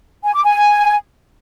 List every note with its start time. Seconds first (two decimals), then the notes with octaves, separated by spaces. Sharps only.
0.24 G#5
0.34 D6
0.44 G#5